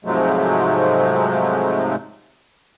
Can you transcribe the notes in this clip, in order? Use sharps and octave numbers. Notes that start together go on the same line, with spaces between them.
G#2 C3 F3 F#3 G#3 A3